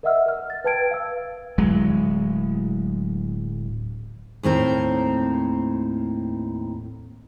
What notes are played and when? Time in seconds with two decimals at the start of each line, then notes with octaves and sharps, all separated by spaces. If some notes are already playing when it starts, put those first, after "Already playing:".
0.03 A#4 D#5 E5 F#5 E6 F6
0.26 A#4 F6
0.50 A6
0.64 B4 G5 A5 G#6 D7
0.91 F5 E6
1.58 D1 F#3 G#3
4.43 D#2 A2 C4 A#4